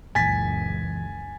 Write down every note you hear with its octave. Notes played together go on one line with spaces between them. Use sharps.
C#2 F#2 A#2 E3 G#5 A6 B6